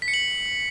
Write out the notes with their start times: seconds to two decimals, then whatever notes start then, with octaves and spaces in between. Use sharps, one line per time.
0.02 B6
0.08 C#7
0.14 F#7